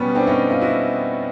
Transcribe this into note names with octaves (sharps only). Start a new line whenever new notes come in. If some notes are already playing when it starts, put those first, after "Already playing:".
Already playing: B2 G3 B3 C#4
C4 D4
C#4 D#4
D#4 F4
E4 F#4